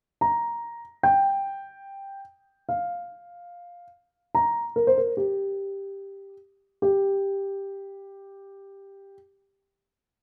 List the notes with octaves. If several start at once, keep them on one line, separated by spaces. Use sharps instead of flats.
A#5
G5
F5
A#5
A#4
C5
A#4
G4
G4